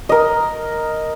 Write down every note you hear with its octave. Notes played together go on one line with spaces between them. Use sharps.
A#4 D#5